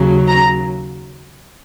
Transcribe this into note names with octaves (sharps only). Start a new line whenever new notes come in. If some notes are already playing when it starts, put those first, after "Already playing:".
Already playing: D#2 C#3 F#3
A#5